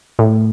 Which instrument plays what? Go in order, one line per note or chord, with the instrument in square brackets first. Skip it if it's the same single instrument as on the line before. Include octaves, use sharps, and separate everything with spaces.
[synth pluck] A2